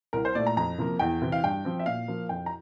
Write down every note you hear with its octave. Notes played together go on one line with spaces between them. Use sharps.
C2 A#4
C5
A#2 A3 D5
A#5
F2 A#5
C3 F3 A#3
E2 G5
C3 E3
F5
G2 G5
F3 C4
E5
A#2 F5
F3 A#3
F2 G5
A#5